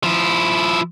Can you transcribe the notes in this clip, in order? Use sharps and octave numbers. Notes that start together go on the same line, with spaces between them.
F3 E4